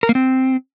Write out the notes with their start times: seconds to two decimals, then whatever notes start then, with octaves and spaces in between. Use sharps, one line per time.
0.03 A#4
0.09 A#3
0.15 C4